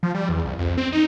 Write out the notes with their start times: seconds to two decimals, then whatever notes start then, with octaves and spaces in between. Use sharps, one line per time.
0.03 F3
0.15 G3
0.29 E2
0.45 C2
0.58 F2
0.77 C4
0.92 D#4